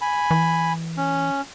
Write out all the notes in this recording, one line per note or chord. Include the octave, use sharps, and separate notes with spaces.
G#5 B5
E3
C#4